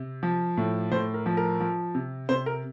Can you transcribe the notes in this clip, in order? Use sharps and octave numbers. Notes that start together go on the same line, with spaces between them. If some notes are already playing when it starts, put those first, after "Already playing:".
Already playing: C3
F3
A2
A2 C5
A#4
F3
A#4
F3
C3
C3 C5
A#4